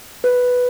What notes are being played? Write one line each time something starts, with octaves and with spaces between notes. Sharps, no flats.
B4